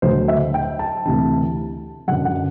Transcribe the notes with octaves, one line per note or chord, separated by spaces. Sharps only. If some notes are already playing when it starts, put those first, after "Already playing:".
D2 D3 F#3 C5
E5
G5
A5
D2 C3 E3 A5
F#2 D3 F#3 F#5
F#5